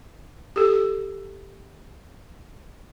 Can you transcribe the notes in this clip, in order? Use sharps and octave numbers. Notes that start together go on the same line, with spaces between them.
G4 A4